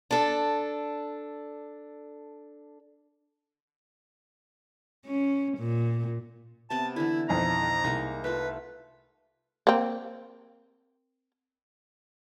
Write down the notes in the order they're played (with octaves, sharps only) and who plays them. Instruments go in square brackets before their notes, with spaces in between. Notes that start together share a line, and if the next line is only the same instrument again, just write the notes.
[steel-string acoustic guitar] D4 A4
[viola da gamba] C#4
A#2
[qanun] C3 B3 [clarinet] A5
[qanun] D3 E3 [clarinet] E4
[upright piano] B1 F2 [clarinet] A#5
[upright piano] C2 [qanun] G#3 A#3 D#4
[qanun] A3 F4 [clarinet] B4
[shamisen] A#3 C4